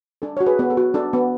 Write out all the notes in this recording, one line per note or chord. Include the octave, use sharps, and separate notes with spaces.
D4 A4
F#4 C#5
G#4 B4
B3
A4
F#4
D4 A4
B3